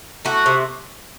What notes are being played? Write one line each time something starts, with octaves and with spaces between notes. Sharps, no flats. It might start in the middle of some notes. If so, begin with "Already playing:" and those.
A3 F#4
C3